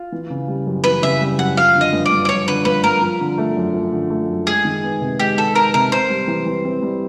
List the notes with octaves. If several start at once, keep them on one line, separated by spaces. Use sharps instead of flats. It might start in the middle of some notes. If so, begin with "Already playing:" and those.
Already playing: F4
E3
C#3
G3
F#2
E3 B4
C#3 E5
G3
F#2 F#5
F3 F5
D3
D#5
G2
D5
G2
D5
F3 C#5
D3 B4
G2 B4
G2 A#4
F3
D3
A3
F#2
F3
D3
A3
F#2
G#3 G#4
D#3
B3
C3
G#3 G4
D#3 A4
B3 A#4
C3 A#4
C4 C5
G3
E3
E3
C4
G3